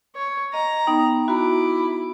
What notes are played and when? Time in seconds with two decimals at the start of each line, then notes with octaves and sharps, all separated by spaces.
0.16 C#5
0.54 D#5 A#5
0.87 B3 D#4 G5
1.28 E4 F#4 A#5 D6